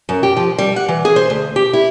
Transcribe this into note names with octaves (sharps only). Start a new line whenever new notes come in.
F#2
G4
F3
G3
F#5
E3
G#4
C5
D2
G4
E4